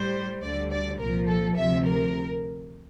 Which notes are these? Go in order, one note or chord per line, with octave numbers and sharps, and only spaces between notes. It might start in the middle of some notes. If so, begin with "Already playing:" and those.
Already playing: A2 G3 C5
D2 D3 G3 D5
D5
C2 A#2 F3 A#4
A4
D2 C3 F3 E5
A#4